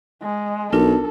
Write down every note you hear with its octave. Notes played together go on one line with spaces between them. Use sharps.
G#3
B1 D4 F4 A4 A#4